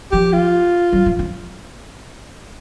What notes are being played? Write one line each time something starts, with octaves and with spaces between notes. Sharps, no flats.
F3 G4
F4
F#3
F3
F3